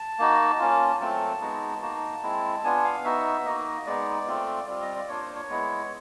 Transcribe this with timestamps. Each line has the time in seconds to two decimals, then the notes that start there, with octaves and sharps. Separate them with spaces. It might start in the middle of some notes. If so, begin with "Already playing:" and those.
Already playing: A5
0.19 A#3 D#4 F#4
0.59 A#3 C#4 F4
1.00 F#3 A3 C4 F4 A5
1.41 G#3 B3 D#4 F#4
1.82 A#3 D#4 F#4 A5
2.23 G#3 C4 E4
2.64 B3 D4 F4 G#5
2.84 F5
3.04 B3 D#4 F#4 E5
3.45 A#3 D#4 F#4 D#5
3.86 G#3 B3 D#4 D5
4.27 A3 C4 F4
4.68 G3 C4 F4 D5
4.81 D#5
4.95 D5
5.09 A#3 D4 F4 C#5
5.22 C5
5.35 C#5
5.50 G#3 B3 E4